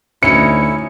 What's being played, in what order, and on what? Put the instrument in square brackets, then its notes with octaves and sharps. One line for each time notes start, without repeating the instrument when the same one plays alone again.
[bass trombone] D2 [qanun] C#4 D#4 [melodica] E4 [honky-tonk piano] C#7